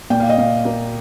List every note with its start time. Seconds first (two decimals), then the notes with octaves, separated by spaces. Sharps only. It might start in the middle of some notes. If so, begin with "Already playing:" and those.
0.10 A#2 G5
0.20 F5
0.30 D#5
0.38 A#2 F5
0.65 A#3